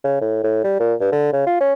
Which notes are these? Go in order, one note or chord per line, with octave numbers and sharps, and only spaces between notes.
C#3
A2
A2
G3
A#2
G2
D3
C#3
F4
C#4